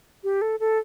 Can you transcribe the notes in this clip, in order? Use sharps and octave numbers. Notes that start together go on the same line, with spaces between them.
G4
A4
A4